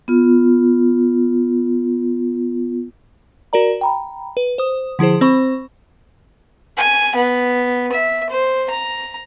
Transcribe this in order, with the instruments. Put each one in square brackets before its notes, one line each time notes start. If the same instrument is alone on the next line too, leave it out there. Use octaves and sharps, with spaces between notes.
[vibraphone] B3 F4
[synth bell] F#4 A#4 D5 A#5
G5 A#5 B5
B4
C5 D#6
D3 F3 E4 G#4 C5
C4 C5 B5 C#6
[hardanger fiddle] G#5
B3
E5
C5
A#5